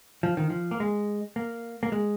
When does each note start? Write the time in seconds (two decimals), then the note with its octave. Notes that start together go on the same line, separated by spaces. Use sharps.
0.23 F3
0.37 D#3
0.50 F3
0.71 A#3
0.80 G#3
1.36 A#3
1.83 A#3
1.92 G#3